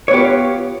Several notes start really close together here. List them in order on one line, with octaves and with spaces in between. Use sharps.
C#5 B3 G4 F4